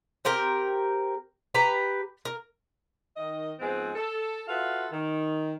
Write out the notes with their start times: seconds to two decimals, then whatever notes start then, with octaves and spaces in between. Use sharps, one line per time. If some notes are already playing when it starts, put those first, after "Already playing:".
0.25 C4 G4 A#4 G5
1.54 G4 B4 A#5
2.25 A#4
3.16 D#3 D#5
3.59 G#2 F3 G#3 B3 C4
3.95 A4
4.48 F4 F#4 A4 B4 E5 F5
4.92 D#3